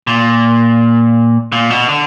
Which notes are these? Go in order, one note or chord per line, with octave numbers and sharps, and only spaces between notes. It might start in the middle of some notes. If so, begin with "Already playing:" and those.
A#2
A#2
B2
D3